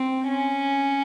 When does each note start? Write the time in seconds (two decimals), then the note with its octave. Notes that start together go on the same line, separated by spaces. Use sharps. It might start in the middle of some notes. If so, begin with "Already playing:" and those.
Already playing: C4
0.28 C#4